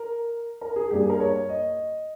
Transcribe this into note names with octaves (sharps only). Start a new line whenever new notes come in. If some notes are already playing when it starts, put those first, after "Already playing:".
Already playing: A#4
A#4
G#4
G2 G3 A#3 G4
G#4
A#4
C#5
D#5